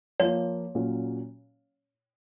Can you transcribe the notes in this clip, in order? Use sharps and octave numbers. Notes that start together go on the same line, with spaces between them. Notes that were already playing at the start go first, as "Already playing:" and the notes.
F3 A#3 F4 C#5
A#2 F#3 C#4